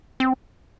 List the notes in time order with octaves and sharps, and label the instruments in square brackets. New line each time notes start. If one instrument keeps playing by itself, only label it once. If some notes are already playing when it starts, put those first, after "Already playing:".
[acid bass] C4